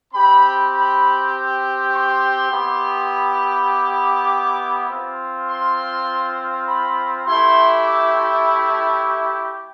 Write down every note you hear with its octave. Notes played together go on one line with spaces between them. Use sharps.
C4 G4 B5
B5
C6
B3 E4 G4
D6
C4 F4
C6
B5
A3 E4 G4 C6
D6
C6
B5